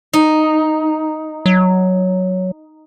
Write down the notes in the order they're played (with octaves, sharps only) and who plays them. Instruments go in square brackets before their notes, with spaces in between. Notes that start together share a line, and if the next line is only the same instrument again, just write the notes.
[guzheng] D#4
[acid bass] F#3